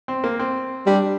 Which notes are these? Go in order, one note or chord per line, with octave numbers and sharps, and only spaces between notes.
C4
A#3
C4
G3 D4